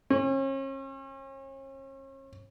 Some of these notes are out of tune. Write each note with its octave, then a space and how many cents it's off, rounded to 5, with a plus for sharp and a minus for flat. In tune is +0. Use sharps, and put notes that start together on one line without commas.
C#4 -40